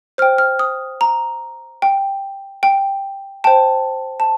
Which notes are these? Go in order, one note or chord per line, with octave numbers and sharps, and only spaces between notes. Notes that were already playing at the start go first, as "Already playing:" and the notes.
C5 G5 F6
F6
D#6
A#5
G5
G5
C5 G5 A5
A5